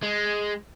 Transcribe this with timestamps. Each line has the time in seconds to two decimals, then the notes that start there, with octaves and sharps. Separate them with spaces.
0.03 G#3